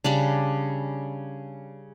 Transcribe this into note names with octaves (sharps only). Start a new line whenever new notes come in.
C#3 G3 D4